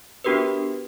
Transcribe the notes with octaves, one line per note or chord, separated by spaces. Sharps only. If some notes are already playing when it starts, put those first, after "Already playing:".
B3 D4 F#4 G4 A#4 B4